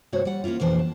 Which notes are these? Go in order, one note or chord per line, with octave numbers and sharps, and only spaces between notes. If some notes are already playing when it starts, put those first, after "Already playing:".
G2 C3 A3 F#4 C5 C#5
G3 F#5
A#3 C#4 D4 E4 F4
F2 B2 E3 A#3 D4 C5
A5